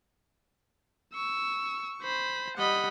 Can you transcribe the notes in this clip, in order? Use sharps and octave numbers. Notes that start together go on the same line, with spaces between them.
C#6 E6
C5 B5
G3 D#5 F#5 B5